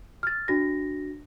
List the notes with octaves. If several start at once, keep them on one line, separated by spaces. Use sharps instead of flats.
F6 A6
D4 F#4 A#6